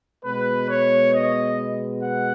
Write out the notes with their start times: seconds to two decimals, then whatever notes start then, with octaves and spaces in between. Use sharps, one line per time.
0.24 B2 G#3 B3 B4
0.69 C#5
1.13 D#5
2.03 F#5